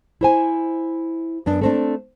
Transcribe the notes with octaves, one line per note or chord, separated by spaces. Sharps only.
E4 C5 G#5
F#2 B3 D4
A3 C4 D4